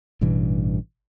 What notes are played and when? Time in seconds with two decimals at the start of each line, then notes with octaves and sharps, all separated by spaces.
0.21 A1 G2 B2 E3